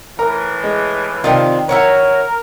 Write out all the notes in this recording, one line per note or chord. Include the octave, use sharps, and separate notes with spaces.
A2 E3 A#4
G#3
C3 D#3 D4 F4
E4 F#4 A#4 C#5